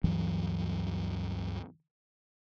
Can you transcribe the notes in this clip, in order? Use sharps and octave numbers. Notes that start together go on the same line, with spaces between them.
D2 G2 E3 F#3